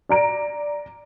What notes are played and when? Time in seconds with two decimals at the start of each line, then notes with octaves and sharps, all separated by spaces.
0.09 D5 A#5 D7